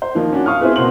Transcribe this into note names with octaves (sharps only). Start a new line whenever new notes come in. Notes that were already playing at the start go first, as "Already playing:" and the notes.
C5
D#3 F3 A#3 D#4
C#4 D4 F#4
F5 C#6 D#6 F6
B3 C4 E4 G#4 B4
B2 A#3 C4 F#4 C6 F#7